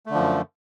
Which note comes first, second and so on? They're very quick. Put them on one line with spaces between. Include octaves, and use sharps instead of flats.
A3 D3 F3 F#2